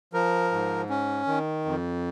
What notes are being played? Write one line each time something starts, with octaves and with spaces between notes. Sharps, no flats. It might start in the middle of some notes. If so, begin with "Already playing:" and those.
F3 A#4
G#2
C#4
D#3
F2